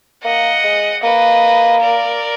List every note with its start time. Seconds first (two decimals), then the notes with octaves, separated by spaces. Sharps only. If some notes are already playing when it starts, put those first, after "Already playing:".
0.24 A#3 D#5 F#5
0.64 G#3
1.03 A#3 B4 D#5
1.81 A#4 D5